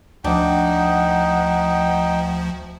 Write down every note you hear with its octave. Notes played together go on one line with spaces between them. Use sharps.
D2 F3 D4 D#4 F#5 G5